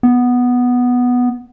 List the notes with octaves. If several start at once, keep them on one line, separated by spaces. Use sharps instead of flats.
B3